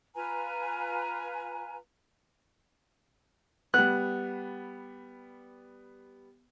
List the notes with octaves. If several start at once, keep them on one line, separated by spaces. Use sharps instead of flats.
F4 B4 G#5 A#5
G3 B3 F#6